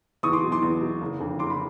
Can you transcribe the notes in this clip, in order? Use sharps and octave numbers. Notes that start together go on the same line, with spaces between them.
E2 C#6 D#6
C6 D6
B2 F#3
C6 D6
E2
B2 F#3
F#1
F2 D3
F#1 C6 D6
B5